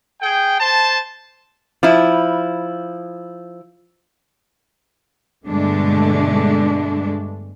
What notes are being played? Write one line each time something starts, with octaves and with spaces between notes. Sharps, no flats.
G#4 G5
C5 A5
F3 E4
G2 B2 D3 G#3 A3 D4